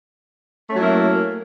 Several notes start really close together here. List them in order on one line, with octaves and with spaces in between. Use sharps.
A3 C#4 F#3 E4 A#3